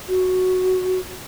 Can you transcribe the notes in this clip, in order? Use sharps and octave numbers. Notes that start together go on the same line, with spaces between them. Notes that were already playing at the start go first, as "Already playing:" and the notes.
F#4